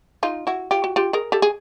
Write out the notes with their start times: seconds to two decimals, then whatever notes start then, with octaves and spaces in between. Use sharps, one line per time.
0.23 D#4 F4
0.47 E4 F#4
0.71 F4 G4
0.84 F#4
0.96 F4 G4
1.13 G#4 A#4
1.32 G4 A4
1.42 G#4